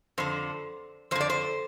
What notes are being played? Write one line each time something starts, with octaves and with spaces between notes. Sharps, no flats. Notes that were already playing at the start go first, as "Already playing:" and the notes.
F2 D3 C5
F2 D3 C5
D5
C5